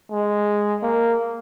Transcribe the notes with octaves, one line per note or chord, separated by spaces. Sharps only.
G#3
A#3